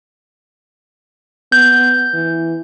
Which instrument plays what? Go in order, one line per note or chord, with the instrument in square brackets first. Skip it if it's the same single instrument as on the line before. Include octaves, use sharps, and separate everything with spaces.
[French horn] B3 [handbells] G6
[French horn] E3